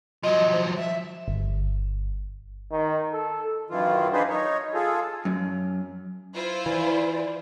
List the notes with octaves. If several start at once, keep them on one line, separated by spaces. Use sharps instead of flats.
F3 F#3 D#5
C5
E5
G1
D#3
A4
F#2 D#3 E3 F4
D4 D#4 F4 G#4 B4 C5
D#4 C#5
F4 G#4 A4
F#2
E4 F4 C5
E3 D5